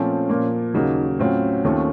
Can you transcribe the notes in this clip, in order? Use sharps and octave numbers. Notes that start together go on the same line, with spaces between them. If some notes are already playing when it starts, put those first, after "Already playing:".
Already playing: A#2 F3 A3 C4 C#4 F4
A#2 F3 A#3
D#2 C#3 F#3 A#3 D#4
A2 F#3 C4 C#4 F4
D#2 D#3 A3 C4 F4